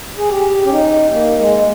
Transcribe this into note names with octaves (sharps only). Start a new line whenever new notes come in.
G#4
G4
C#4
D#4
A#3
G#3